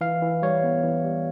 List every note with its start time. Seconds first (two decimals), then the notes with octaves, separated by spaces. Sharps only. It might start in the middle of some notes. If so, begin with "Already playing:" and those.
0.01 E3 F5
0.22 E3
0.42 G3 C#5
0.63 B3
0.84 E3
1.05 G3